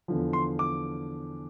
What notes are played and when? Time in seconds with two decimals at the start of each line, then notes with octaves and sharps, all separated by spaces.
0.08 E2 D3 F3
0.33 C6
0.59 D6